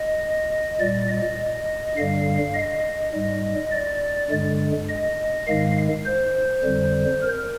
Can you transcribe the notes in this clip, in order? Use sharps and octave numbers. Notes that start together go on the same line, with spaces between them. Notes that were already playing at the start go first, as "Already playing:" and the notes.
Already playing: D#5
A#2 G3 D5
D#5
G2 D3 G3 F5
D#5
G#2 G3
D5
G2 D3 G#3
D#5
G#2 D#3 G#3 F5
C5
F2 D3 G3
A#4